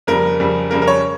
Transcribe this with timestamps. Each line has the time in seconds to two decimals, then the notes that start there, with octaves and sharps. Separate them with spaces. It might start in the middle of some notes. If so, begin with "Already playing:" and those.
0.07 F2 C#3 G3 A#4
0.40 F2 C#3 G3
0.71 F2 C#3 G3 A#4
0.82 A#4
0.87 C#5